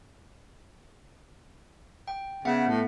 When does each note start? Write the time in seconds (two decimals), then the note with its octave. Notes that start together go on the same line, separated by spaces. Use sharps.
2.08 G5
2.45 C#3 B3 E5 F#5
2.67 A2